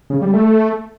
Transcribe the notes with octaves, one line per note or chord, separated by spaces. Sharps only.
C#3
G3
A3